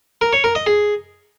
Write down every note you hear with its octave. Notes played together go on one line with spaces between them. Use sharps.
A#4
C#5
A#4
D#5
G#4